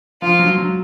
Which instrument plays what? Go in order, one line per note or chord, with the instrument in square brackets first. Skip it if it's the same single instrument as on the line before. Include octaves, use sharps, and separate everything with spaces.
[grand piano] F3 [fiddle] F4
[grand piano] F#3
F#3